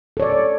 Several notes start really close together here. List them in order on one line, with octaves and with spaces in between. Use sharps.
A4 C#5 D5